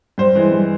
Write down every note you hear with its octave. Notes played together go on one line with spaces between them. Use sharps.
G2 C5
E3 G#3
G2